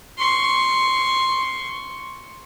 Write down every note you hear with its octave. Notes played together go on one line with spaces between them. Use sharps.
C6 C#6